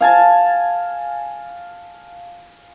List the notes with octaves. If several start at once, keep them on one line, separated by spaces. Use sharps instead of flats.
F5 G#5 A5